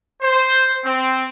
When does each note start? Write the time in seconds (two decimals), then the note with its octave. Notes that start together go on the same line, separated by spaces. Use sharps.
0.22 C5
0.84 C4